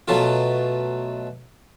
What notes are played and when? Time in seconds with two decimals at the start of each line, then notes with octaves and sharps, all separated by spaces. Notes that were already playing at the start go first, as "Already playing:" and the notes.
0.08 B2 F#3 A3 F4